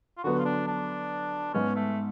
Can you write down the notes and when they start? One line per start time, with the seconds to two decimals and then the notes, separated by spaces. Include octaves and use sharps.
0.18 F4
0.24 D3 F#3 B3 F#4
0.39 F4
0.45 D4
0.67 D4
1.54 G#2 G#3 B3 C#4
1.76 A3